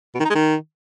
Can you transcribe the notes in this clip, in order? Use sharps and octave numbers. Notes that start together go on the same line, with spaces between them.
B2
D#3
D#4
G#3
D#3